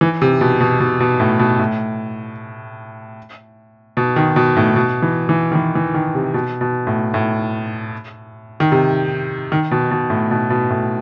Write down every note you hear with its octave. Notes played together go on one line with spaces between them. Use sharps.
E3
C3
B2
B2
B2
B2
A2
B2
A2
B2
D#3
B2
A2
B2
E3
E3
D#3
E3
E3
D#3
C3
B2
B2
A2
A2
D#3
C3
D#3
B2
B2
A2
B2
B2
A2